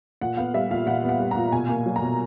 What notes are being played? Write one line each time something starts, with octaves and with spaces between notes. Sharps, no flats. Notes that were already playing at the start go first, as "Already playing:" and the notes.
A#2 F#5
B3 F5
G3 E5
A#2 F5
A#2 F#5
B3
F#5
G3
A#2 A#5
B2 G#5
A#3
F#3
A#5
B2